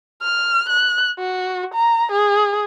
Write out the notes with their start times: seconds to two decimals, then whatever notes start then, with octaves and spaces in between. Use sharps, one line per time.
0.22 F6
0.69 F#6
1.18 F#4
1.74 A#5
2.11 G#4